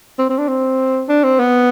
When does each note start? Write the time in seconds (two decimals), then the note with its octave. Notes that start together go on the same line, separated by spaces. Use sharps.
0.19 C4
0.29 C4
0.39 D4
0.48 C4
1.09 D4
1.24 C4
1.39 B3